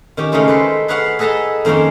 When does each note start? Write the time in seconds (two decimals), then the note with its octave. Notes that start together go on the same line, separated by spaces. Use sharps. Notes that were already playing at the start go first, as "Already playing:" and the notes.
0.17 D#3 C#4 G4
0.32 C#3 G#3 A3 C#4 D#4 F4
0.48 A4 B4 C5
0.88 G#4 B4 C#5 F5 F#5
1.19 G#4 A4 B4 D#5 A5 A#5
1.65 F2 D#3 A#3 C#4 C6